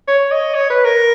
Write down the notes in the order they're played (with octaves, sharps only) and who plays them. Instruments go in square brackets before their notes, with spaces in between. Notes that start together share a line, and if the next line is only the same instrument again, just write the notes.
[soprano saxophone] C#5
D#5
C#5
B4
A#4